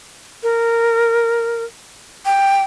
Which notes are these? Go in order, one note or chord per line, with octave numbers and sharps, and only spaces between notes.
A#4
G5